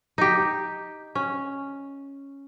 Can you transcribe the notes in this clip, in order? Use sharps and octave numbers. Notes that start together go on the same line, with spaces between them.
D#4 G4
C#4